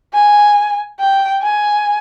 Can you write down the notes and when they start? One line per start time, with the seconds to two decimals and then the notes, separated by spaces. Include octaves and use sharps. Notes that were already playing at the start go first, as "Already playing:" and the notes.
0.14 G#5
1.00 G5
1.42 G#5